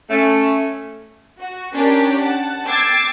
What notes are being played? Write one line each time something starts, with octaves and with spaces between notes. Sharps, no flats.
A3 C#4
F#4
C#4 D4 G4 A#4 C#5
F#5 A5
G5 D6 E6 G#6 A6 C7